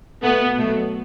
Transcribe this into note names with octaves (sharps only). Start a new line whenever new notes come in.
B2 A3 B3
B2 F#3 A3